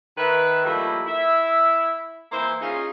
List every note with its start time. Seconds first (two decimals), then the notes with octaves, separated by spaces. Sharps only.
0.18 D#3 B4 E5
0.65 F3 G3 A3 A#3 D#4 E4
1.07 E4 E5
2.32 E3 A#3 E4 C5
2.61 C#4 D#4 F4 G#4 F5